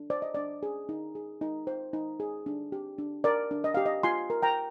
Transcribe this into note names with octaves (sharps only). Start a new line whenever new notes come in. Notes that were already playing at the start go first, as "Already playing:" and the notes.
Already playing: D4
C5 D5
D#5
D4 D5
G#4
D#4
G#4
D#4
C5
D#4
G#4
D4
G4
D4
A#4 D5
D4
D#5
G4 F5
D#5
F4 G#5 C6
A#4
G5 A#5